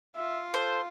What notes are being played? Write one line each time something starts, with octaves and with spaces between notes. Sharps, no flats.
F4 E5
A4 C5